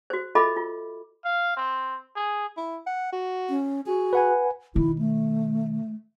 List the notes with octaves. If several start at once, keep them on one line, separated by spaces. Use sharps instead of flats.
F#4 C5
F4 A4 D#5 E5 B5 D6
F4
F5
C4
G#4
E4
F#5
F#4
C#4
F#4 G#4
B4 F#5 G#5
B2 D#3 E4
A3